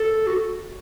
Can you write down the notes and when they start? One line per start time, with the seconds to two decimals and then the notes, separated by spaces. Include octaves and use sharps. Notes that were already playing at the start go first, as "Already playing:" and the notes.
Already playing: A4
0.27 F#4